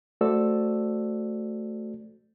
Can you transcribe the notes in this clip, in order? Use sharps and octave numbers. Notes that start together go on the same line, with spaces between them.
A3 F#4 A4 C5 D5 E6